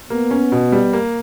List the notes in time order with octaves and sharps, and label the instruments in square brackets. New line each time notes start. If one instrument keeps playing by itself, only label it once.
[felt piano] A#3 [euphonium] B3
[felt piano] C#4
B2
G3
A#3